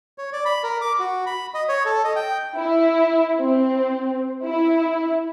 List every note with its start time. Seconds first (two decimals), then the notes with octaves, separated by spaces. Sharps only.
0.18 C#5
0.33 D5
0.45 B5
0.64 A#4
0.81 D6
0.99 F#4
1.26 B5
1.54 D#5
1.69 C#5
1.85 A4
2.04 D#5
2.16 G5
2.56 E4
3.39 C4
4.45 E4